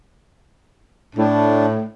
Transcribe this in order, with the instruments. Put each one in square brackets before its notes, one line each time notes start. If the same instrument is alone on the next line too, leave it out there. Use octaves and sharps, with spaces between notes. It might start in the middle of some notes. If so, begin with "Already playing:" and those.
[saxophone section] A2 [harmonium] D4